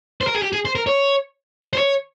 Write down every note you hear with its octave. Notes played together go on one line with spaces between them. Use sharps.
C5
A#4
G#4
G4
G#4
C5
A#4
C#5
C5
C#5